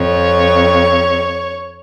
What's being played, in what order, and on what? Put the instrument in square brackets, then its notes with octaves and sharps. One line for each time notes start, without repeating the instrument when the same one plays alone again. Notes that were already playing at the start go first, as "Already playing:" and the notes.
Already playing: [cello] F2 [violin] C#5